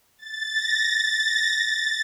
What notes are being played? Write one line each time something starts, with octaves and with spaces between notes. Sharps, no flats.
A6
A#6
A6
A#6
A6